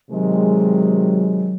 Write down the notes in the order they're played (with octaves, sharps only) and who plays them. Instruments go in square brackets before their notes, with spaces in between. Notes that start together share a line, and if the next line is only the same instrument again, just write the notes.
[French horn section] C3 D#3 G#3 [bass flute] F#3